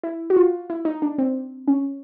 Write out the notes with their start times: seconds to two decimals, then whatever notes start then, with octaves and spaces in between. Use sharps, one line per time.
0.03 E4
0.30 F#4
0.36 F4
0.70 E4
0.85 D#4
1.02 D4
1.18 C4
1.68 C#4